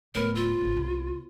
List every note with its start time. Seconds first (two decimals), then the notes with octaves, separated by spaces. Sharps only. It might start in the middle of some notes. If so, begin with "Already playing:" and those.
0.15 D1 A2 B3 A#4 B4 C#5
0.35 F4 E6
0.61 G#1 G#2
0.77 C2 B5